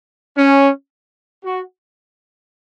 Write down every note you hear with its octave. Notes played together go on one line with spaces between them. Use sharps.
C#4
F#4